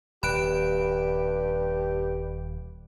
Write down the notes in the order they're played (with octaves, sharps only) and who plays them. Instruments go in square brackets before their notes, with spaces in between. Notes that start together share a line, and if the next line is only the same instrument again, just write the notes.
[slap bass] D#1 [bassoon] G2 [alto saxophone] G4 [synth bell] B5 F#6 D7